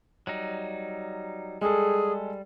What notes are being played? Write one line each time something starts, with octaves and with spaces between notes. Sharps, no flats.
F#3 G3 D#4
G3 G#3 G#4 A4